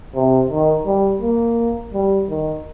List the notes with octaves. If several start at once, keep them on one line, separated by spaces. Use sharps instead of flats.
C3
D#3
G3
A#3
G3
D#3